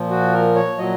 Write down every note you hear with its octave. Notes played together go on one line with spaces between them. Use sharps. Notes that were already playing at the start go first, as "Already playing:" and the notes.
Already playing: A#2 F3
F#4
A#4
C#5
A#2 F#3 D#5